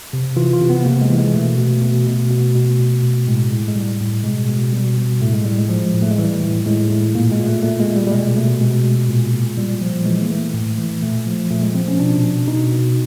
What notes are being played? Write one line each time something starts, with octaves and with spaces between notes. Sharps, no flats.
C3
E3 F4
F4
C3
B3
C3 A#3
G#3
E3
G#3
B2 A3
B2
B2
B2
B2
B2
B2
B2
A2 G#3
A2
G#3
A2 G3
A2
B2 G#3
B2
B2 G3
B2
A2 A3
G#3
A2 G3
G#3
F3
A2
A3
G#3
E3 G3
A2
A2 G#3
A2
A#2 A#3
G#3
A#2
A3
A#2 A3
G#3
A#2
G3
G3
B2 G#3
B2 A3
B2 G#3
B2
A#2
A#2
A#2 G3
F3
E3 G#3
A#3
E3 A3
A2
E3
A#2 A3
F3
A#2 A3
G#3
F3 C4
C#4
B2 D4
B2
B2 D#4
B2